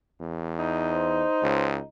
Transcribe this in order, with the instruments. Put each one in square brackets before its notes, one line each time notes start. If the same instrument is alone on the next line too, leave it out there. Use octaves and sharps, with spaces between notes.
[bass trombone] E2
[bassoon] D#4
[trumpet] C5
[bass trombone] C#2